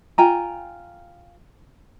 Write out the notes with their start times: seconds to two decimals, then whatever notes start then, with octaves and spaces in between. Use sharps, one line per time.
0.18 F4 G5 G#5 A#5